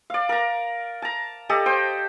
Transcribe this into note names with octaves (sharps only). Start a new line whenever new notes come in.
D5 F5
A#4 A#5
A5 A#5
G4 A4 D5 D#5
C5 G5